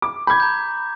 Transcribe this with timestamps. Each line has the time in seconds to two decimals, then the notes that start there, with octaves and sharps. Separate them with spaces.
0.02 D6
0.27 B5 D6 G6 G#6
0.40 A#5 G6